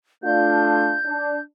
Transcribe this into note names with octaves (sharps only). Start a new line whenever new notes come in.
A3 D4 F4 G6
D4